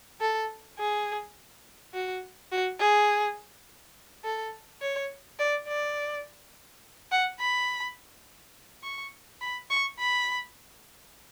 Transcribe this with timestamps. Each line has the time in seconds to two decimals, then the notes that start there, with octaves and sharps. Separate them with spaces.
0.21 A4
0.79 G#4
1.94 F#4
2.52 F#4
2.80 G#4
4.24 A4
4.81 C#5
5.39 D5
5.68 D5
7.11 F#5
7.40 B5
8.83 C#6
9.41 B5
9.71 C#6
9.99 B5